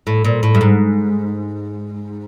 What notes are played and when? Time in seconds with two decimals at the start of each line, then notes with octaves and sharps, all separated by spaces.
0.07 A2
0.24 A#2
0.43 A2
0.55 G2
0.61 G#2